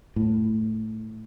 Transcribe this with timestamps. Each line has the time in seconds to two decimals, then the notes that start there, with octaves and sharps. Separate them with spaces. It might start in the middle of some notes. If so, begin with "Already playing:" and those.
0.16 A2